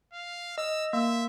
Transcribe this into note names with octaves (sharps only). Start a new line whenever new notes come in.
F5
D#5 E6
A#3 E5